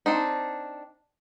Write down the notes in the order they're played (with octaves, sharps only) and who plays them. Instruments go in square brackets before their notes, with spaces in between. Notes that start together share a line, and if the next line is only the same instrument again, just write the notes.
[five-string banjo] C4 D4 D#4